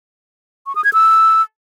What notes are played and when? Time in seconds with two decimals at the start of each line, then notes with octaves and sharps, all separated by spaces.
0.66 C#6
0.75 D#6
0.84 G#6
0.93 E6